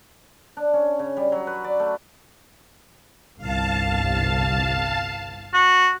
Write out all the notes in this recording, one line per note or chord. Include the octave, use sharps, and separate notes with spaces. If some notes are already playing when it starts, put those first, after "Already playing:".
D4
C#4
C#3
G3
F#3
B4
D5
A3
G1 C2 F5 A5
F#4